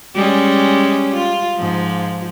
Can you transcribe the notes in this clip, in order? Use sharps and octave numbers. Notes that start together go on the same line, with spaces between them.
G3 G#3 C#4
F4
G#2 F3